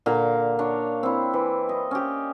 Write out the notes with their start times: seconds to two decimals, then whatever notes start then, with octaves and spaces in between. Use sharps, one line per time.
0.06 A#2 D3 F5 A#5
0.59 D4 C#5
1.03 C4 E4
1.34 E3
1.69 D#5
1.91 C#4 G4